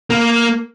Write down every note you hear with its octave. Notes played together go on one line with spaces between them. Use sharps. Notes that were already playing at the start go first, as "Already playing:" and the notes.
A#3